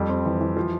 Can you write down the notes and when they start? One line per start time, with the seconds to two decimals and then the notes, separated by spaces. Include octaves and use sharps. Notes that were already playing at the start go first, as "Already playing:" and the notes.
Already playing: F2 G3
0.09 C4
0.25 E3
0.41 E3
0.57 F3